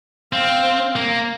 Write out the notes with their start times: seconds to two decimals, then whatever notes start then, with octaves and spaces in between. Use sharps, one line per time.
0.32 C4 F5
0.96 A#3